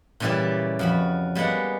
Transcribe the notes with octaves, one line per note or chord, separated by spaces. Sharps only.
A#2 C#3 E3 G3 E4 G4
F2 F#4 B5
G3 G#3 A#3 B3 F#5